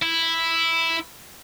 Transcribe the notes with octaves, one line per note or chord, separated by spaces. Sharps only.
E4